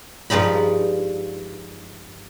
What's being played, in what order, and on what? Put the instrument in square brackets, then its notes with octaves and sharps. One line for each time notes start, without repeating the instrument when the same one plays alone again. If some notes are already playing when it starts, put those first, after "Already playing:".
[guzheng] G2 F3 G#3 D#4 B5